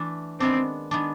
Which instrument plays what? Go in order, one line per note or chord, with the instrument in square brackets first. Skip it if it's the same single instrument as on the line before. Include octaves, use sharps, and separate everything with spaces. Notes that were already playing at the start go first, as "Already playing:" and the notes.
Already playing: [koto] E3 A3 D4
[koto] D#3 G#3 B3 D4 [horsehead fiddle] C4
[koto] D#3 G#3 B3 D4